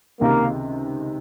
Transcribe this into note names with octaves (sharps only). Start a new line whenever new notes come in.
C#2 C3 D#3 A#3